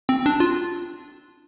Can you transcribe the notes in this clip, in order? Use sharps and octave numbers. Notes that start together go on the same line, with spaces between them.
C4
D4
F4